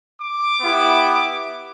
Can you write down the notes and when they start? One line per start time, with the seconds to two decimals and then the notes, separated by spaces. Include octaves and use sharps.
0.18 D6
0.61 B3 E4 G4